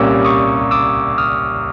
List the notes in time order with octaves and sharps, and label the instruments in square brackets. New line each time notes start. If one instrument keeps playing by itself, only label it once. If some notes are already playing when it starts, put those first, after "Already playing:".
Already playing: [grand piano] C2 A#2 G3 A#3 C#4 [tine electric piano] D6 E6
[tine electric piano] C#6 D#6
D6 E6
D#6 F6